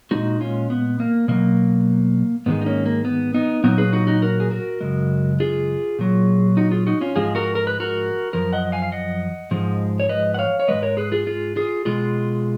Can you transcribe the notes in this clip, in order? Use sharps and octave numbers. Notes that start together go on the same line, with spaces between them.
A#2 G#3 D#4 F#4
C#4 F4
B3
A#3
B2 F#3 A#3
G#2 D#3 G#3 B3
D#4
A#3 C#4
A#3
B3
B3 D#4
A#2 F#3 B3 D#4
G#4 B4
D#4 F#4
D#4 F#4
F#4 A#4
G#4
F#4 A#4
F#2 C#3 G#3
F4 G#4
A#2 F#3
D#4 F#4
F4 G#4
D#4 F#4
C#4 F4
G#2 F3 G#3 F4 G#4
F#4 A#4
A#4
B4
F#4 A#4
F#2 F3 A#4
D#5 F#5
F5 G#5
F5
D#5 F#5
G#2 F3 G#3
C#5
B4 D#5
F#5
C#5 F5
C#5
F3 G#3 B4 D#5
G#2
A#4 C#5
G#4 B4
F4 G#4
F4 G#4
F4 G#4
B2 G#3 F4 G#4